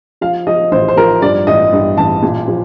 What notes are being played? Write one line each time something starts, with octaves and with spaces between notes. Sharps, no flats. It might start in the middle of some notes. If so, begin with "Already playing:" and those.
F3 F5
F3 D#5
A1 C5
C5
F3 A#4
G2 D5
A1 D#5
G2
A1 A5
A#2
F3